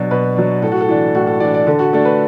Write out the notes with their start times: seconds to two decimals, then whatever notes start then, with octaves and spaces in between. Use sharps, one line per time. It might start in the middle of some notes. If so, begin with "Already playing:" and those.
Already playing: B2 F#3 D4
0.11 B2 B4
0.36 F#3 D4
0.62 A2 A4
0.72 F#4
0.81 A4
0.88 E3 D4
1.15 A2 F#4
1.27 A4
1.40 E3 D4 D5
1.54 D5
1.67 D3 A4
1.79 F#4
1.93 A3 D4 A4
2.05 B4